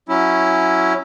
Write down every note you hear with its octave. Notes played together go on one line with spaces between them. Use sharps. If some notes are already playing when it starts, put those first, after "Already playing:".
F#3 C#4 E4